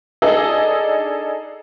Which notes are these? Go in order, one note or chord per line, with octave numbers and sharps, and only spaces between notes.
D4 D#4 G#4 A4 D5 D#5